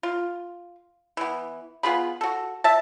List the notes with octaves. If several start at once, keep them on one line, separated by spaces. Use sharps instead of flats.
F4
E3 B3
B3 F4 G#4 B5
F#4 A4
E5 A5